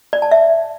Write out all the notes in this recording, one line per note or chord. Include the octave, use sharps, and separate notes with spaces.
D5
A5
E5